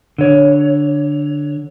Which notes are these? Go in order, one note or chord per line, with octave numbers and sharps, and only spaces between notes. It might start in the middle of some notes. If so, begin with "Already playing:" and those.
D3 C#5